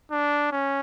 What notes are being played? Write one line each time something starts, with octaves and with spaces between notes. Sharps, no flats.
D4
C#4